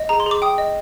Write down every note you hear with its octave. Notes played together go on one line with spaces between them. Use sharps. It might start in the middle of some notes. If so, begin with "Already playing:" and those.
Already playing: D#5
G#4 A#5
C6
G#4 D6
G5 D#6
D#5